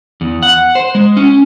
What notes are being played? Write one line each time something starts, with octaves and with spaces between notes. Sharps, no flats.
E2
F#5
C5
G#3
C#4